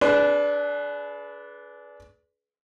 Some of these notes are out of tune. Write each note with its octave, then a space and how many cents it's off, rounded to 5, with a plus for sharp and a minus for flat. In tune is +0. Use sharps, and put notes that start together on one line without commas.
D4 -15 G#4 +35 B4 +0